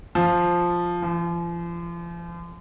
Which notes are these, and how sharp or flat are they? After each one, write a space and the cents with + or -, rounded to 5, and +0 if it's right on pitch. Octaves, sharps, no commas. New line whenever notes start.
F3 +0
F3 -40